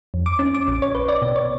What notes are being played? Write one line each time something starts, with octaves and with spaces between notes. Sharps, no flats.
F2
D6
C#4
D6
A#1
C#5
B4
D5
B2
C#5